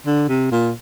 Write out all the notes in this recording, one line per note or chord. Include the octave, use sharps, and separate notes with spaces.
D3
C3
A#2